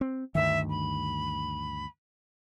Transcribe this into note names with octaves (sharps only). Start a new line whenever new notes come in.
C4
D2 G2 D#3 E5
B5